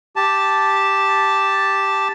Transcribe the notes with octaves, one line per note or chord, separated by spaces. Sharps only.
G4 A5